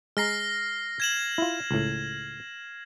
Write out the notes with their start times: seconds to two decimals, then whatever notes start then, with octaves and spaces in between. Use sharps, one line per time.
0.17 G#3 A#5 F6 A#6 C7
1.00 G#6 E7 F#7
1.38 E4 F4
1.71 C#2 A2